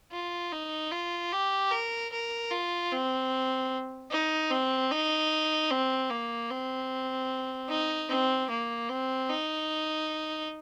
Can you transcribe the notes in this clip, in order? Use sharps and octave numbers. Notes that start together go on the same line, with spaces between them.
F4
D#4
F4
G4
A#4
A#4
F4
C4
D#4
C4
D#4
C4
A#3
C4
D#4
C4
A#3
C4
D#4